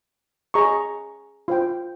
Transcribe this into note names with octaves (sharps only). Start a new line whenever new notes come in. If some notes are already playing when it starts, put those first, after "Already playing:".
G#4 D#5 A#5 C#6
F4 C5 G5